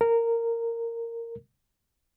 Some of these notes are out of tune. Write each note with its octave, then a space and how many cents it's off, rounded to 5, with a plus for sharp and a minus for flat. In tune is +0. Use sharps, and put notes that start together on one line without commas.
A#4 -15